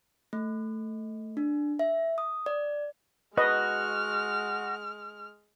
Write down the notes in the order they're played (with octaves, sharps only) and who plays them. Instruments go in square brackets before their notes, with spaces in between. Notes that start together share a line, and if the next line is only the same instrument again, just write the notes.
[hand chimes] A3
D4
E5
D#6
D5
[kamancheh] G#3 F6 [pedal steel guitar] F#4 [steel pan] B4 D#5